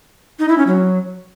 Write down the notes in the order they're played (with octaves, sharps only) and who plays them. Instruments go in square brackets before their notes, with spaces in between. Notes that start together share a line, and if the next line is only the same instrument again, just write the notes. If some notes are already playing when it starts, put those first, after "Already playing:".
[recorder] D#4
E4
C#4
F#3